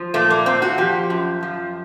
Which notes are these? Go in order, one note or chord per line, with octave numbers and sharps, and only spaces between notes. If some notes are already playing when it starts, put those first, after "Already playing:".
Already playing: F3
A#2 A3
A#3
A#2 C4
F#4
F3 G4
F#2
F3